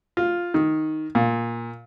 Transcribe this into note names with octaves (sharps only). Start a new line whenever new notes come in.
F4
D#3
A#2